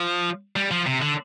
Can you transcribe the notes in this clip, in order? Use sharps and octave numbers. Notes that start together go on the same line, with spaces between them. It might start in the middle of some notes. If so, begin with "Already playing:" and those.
Already playing: F3
G3
F3
C3
D3